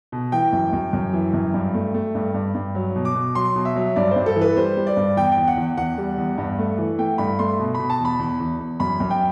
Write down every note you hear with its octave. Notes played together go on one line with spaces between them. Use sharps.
B2
E3 G5
F#2
F#2
F#2
E3
F#2
G2
A3
A3
G2
G2
G2
F#3
B2
D6
B2
F#3 C6
B2
E5
F#3
G2 D5
G2 C5
A4
E3
B4
G3 C5
G3
D5
G2
E2 G5
G5
E2
F#5
E2
E2 F#5
G3
E2
G2
A3
E3
A3 G5
G2 B5
A3 C6
B2
B2 B5
A5
E2
B5
E2
E2
E2
F#2 B5
F#2
G5